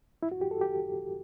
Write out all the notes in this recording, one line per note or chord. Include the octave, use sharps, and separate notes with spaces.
E4
F#4
G4
A4
G4